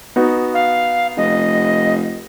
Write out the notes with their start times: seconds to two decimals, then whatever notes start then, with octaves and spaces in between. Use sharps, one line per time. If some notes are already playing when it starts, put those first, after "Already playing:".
0.16 B3 D#4 F#4
0.54 F5
1.17 F1 D#5